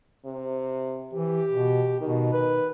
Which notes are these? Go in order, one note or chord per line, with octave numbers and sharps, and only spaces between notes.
C3
E3 G4
B2
B2 D#3
B4